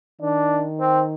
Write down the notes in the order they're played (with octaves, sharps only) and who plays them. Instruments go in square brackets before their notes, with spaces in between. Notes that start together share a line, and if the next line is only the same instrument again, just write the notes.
[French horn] D#3 [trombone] D4
[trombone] C4